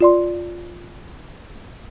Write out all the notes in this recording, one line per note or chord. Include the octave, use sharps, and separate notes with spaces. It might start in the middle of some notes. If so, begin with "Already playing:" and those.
F4 D5 C6